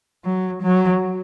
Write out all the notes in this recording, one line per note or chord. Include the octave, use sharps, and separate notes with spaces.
F#3
F#3